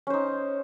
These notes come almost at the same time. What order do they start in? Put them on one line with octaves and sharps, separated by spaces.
C#4 C5 D#4